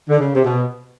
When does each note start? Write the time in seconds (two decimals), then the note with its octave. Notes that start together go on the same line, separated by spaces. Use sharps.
0.09 D3
0.19 C#3
0.35 C3
0.44 B2